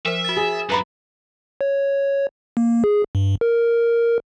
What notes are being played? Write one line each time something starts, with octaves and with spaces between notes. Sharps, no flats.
F3 A#4 C5 E5
F#4 A6
G#4
F#2 B4 A#5 B5
C#5
A#3
G#4
G2
A#4